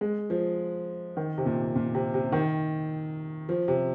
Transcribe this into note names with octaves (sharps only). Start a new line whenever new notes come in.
G#3
F3
D#3
C3
A#2
A#2
C3
C3
D#3
F3
C3